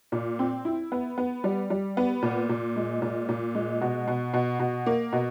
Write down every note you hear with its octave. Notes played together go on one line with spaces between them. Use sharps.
A#2
C4
E4
B3
B3
G3
G3
B3
A#2
A#2
G#3
A#2
A#2
G#3
B2
B2
B2
B2
A#3
B2